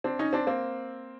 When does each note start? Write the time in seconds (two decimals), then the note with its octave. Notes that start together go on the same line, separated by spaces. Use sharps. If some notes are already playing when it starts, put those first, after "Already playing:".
0.04 C4 D4
0.19 C#4 D#4
0.33 C4 D4
0.47 A#3 C4